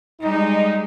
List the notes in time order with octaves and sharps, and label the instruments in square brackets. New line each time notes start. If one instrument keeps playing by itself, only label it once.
[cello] G3 G#3 [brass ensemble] D#4